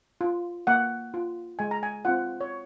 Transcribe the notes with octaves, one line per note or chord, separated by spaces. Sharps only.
F4
A#3 F#5
F4
G#3 G#5
A#5
G#5
C4 F4 F#5
C#5